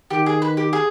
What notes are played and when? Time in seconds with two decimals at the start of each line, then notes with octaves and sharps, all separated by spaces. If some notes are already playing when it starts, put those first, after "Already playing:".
0.11 D#3 G4
0.26 G#4
0.42 B4
0.57 G4
0.73 G#4